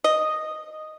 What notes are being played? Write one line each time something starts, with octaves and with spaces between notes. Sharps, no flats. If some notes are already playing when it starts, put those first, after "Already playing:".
D#5